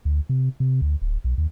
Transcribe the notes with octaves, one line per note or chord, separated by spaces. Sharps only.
D2
C3
C3
D2
D1
B1
D#2